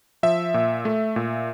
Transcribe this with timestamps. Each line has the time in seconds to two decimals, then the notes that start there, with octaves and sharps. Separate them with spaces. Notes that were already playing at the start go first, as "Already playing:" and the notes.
0.23 F3 E5
0.54 A#2
0.85 A3
1.16 A#2